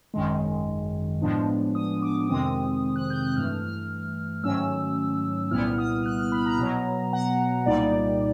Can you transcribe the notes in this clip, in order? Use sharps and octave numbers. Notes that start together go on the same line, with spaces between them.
G#1 F#2 D#3 G#3
A2 F3 G#3 B3 D4
D#6
D6
F2 C3 D#3 G#3 C4 D#6
F#6
G6
F#6
G2 E3 A3 F6
F6
G#2 D#3 F#3 A3 C#4 E6
C2 A#2 G3 B3 E4 F6
D#6
F6
F#6
F6
B5
A#5
B2 F#3 B3
F#5
C2 A#2 G3 A#3 D#4 D5